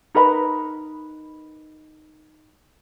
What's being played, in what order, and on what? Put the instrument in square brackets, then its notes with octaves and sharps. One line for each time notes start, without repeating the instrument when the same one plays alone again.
[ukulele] D#4 A#4 B4 B5